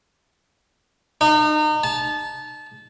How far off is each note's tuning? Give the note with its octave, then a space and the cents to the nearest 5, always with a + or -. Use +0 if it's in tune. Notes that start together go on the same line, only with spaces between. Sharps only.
D#4 -35
A5 -25